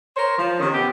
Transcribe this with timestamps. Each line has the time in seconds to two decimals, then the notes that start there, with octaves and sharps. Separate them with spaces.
0.16 A#4 C5 C#5
0.39 F3
0.60 C3 D#3 C#4
0.74 B3 G4